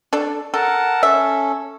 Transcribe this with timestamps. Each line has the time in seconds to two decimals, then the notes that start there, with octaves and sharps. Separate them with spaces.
0.13 D4 A4
0.54 A4 A#4 F#5 A5
1.03 C#4 A4 E5